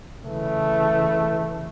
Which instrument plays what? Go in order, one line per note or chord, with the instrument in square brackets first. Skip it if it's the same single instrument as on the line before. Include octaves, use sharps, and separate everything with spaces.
[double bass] C#3 E3 [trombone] A3